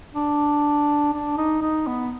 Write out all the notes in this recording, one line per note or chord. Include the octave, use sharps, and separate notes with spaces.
D4
D4
D#4
D#4
B3